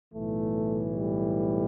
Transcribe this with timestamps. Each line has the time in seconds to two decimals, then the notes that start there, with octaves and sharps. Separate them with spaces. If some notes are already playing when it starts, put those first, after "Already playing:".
0.13 B1 A2 E3 A3
0.93 G3